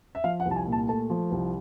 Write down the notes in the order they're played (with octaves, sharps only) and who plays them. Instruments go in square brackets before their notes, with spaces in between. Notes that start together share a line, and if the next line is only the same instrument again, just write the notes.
[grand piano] E5
F3 F5
F#5
C2
A5
G#5
A#2
A5
A3 A5
F3
C2